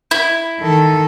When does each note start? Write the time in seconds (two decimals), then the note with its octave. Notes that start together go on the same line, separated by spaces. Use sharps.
0.11 E4
0.60 D#3 A4